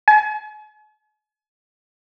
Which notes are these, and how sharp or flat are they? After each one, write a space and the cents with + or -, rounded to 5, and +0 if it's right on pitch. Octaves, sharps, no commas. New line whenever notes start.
G#5 +40